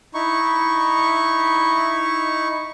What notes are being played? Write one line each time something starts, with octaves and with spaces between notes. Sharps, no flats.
D#4 E4 C#6